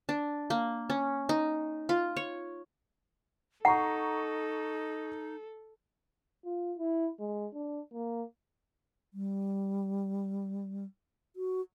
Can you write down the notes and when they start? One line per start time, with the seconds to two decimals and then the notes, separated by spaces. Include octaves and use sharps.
0.09 D4
0.50 A#3
0.90 C#4
1.29 D#4
1.89 F4
2.16 C#5
3.65 D#4 A4 F#5 A#5 C#6
6.45 F4
6.78 E4
7.20 G#3
7.54 D4
7.93 A#3
9.13 G3
11.36 F#4